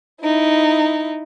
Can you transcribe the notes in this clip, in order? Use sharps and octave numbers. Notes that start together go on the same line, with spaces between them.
D#4 E4